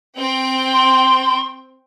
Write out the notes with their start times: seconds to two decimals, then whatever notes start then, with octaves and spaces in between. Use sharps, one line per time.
0.18 C4 G5
0.73 C6